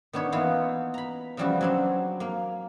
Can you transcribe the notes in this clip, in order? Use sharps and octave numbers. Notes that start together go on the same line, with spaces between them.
D#3 B3 D4 C#5 B5
E3 A#3 B3 D#4 F4
A#5 B5
C#3 E3 F3 G3 E4 F#4
F#3 C4 D4
A#3